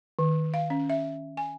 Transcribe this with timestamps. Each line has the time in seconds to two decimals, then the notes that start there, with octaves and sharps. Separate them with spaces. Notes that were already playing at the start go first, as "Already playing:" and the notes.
0.19 D#3
0.54 F5
0.70 C#4
0.90 E5
1.37 G#5